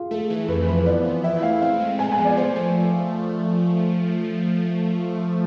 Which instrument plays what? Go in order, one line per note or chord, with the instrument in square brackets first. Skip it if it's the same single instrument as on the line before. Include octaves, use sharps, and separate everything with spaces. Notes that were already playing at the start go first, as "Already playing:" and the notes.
Already playing: [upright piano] F4 G#4
[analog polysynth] A3 [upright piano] A4
[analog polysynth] E3
[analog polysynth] F2 [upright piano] B4
[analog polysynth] F3 [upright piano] B4
[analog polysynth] B3 [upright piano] D5
[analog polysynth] E3
[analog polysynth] E4 [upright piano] E5
[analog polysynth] A3 [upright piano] F5
[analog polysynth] C4 [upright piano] F5
[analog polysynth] G#3
[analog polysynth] B3 [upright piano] G#5
[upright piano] G#5
[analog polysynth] F3
[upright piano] D5
[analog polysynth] A3 [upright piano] C5
[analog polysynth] F3